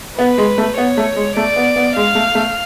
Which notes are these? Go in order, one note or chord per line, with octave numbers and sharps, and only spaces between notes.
B3 B4
G#3
A3
B3 C#5
A3
G#3
A3 D5
B3
B3
G#3 F5
A3
A3